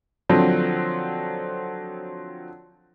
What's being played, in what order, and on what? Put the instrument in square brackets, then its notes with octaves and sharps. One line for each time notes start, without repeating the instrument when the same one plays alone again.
[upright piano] D3 F3 F#3 C4